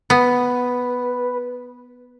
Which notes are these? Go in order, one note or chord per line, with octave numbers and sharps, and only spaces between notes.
B3 B4